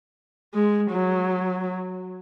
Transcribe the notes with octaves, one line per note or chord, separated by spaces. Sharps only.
G#3
F#3